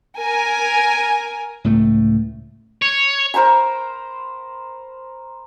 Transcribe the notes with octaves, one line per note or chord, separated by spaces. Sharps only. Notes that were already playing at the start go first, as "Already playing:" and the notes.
A#4 G#5
C#2 A2 A3
C#5
A#4 C5 A#5 B5